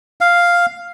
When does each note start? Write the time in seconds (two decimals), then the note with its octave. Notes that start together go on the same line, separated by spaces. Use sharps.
0.21 F5